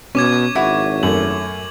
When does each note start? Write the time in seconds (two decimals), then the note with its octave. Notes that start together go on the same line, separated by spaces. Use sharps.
0.15 B2 C#4 C#6 D6 G#6
0.55 G#1 E4 F#4 C#5
1.03 F#2 A3 F#7